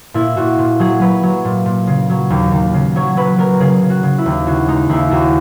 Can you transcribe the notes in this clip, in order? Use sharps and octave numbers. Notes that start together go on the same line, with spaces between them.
A#2 E4
A#2 F#4
A#2
F#3 G#4
F#3 B4
F#3
A#2
A#2
C#3
F#3
D#2
D#2
C#3
F#3 C#5
F#3 B4
F#3 A#4
C#3 G#4
C#3
F#4
C#3
E4
D#2
C#3 F#4
G#3 D#4
D#2 E4
D#2 F#4